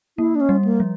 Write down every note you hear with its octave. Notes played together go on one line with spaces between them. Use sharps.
A#3 E4
D4
C#4
G3
A#3
F3